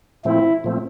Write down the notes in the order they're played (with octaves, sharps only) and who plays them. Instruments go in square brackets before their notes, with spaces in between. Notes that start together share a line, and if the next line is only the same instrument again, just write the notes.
[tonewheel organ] A#2 F3 A3 C4 [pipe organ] E4
[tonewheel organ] A#2 F3 A3 C4